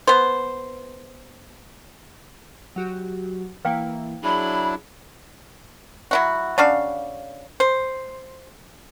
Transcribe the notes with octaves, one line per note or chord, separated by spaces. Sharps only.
B3 C5
F#3 F#4 G4
E3 A#3 E4 B4 F5 G5
F#3 D4 E4 G#4 B5
F#3 E4 F#4
C#3 D4 F#4 F5
C5